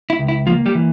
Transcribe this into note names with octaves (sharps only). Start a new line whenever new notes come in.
E4
C#2
E4
F3 A#3 F4
G3 G4
E3